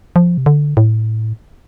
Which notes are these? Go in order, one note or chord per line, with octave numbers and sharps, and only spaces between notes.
F3
C3
D3
A2